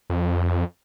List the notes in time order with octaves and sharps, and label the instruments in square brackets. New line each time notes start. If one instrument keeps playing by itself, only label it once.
[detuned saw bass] F2